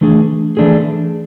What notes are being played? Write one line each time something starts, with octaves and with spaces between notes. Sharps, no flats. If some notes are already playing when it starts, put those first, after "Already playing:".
E3 A3 D4 G#4
E3 A3 D4 G#4